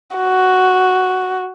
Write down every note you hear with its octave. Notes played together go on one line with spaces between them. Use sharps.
F#4